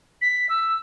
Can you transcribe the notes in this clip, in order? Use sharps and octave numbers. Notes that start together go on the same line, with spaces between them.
B6
E6